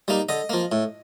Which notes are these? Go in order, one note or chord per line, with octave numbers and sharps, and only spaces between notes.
G3 A#3 D#4
D3 D#5
F3 A#3
A2